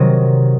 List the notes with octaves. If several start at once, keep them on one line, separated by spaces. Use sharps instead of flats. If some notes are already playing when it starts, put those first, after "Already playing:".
Already playing: C3 D#3 F#3 C4 D#4 D#5